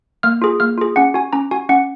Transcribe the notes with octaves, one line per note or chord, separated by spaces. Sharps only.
A#3 F6
F4 G#4
A#3 F6
F4 G#4
C#4 F#5
F#4 G#5
C#4 A#5
F#4 G#5
C#4 F#5